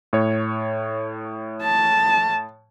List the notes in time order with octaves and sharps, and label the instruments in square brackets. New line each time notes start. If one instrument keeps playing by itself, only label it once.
[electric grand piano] A2 C#5
[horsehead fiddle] A5